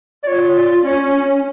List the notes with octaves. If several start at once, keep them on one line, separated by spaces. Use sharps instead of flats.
D5
F4 C#5
D5
C#4 C#5